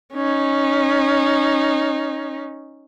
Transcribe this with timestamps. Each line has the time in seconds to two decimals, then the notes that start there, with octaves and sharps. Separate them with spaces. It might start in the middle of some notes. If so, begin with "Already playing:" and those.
0.14 C#4 D#4